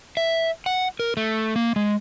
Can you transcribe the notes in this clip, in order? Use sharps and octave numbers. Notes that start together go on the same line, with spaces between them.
E5
F#5
A#4
A3
A#3
G#3